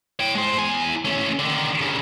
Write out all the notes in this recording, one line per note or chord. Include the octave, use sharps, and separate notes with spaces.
C#5 G5
G#3 C5
E2 G#5
A3 C#4
D3 D#3
G2 C#3